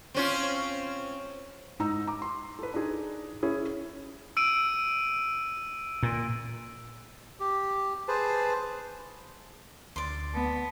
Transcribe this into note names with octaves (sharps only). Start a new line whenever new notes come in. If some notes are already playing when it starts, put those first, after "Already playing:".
C4 C#4 F4
G#2 D#4 A#5 E6
A#5 D6
C6
A4 B4
D4 D#4 G#4
C#4 E4 G#4 C#5
E6 D7 D#7
A#2
G4
G#4 B4 C5 A5
D2 D5 C6
B3 A5